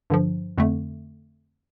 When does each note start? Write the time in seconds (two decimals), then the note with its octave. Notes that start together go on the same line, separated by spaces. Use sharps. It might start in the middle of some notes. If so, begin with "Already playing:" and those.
0.10 G2 D3 F3
0.58 F2 D3 A3